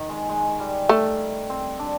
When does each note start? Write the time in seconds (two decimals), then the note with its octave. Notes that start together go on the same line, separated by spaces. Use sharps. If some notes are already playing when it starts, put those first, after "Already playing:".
Already playing: D#3
0.09 G#3
0.29 G#3
0.60 G3
0.89 A3
1.50 C4
1.79 D4